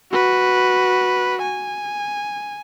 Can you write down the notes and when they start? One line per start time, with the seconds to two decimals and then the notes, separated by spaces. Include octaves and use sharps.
0.12 F#4 B4
1.42 G#5